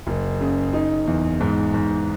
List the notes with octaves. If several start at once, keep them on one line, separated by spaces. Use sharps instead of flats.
F#1
C#3
D#4
E2
G#2
G#2